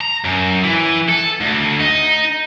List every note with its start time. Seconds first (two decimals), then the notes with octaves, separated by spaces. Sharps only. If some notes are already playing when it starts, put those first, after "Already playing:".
0.01 A#5
0.24 F#2
0.64 E3
1.09 A4
1.41 D2
1.80 D#4